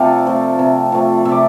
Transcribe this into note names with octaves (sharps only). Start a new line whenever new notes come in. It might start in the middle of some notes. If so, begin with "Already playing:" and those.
Already playing: C3 F3 A3 A4 D5 F5 G5
F3 A3
C3
F3 A3
C3 E5
D5